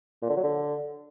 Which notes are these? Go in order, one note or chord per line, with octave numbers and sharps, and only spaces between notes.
A#2
D3
F#3
D3